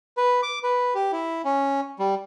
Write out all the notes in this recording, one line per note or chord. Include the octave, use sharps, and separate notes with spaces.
B4
D6
B4
G4
E4
C#4
G3